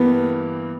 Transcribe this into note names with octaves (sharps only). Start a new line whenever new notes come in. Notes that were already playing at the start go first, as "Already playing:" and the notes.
Already playing: G2 E3 G3 A#3 B3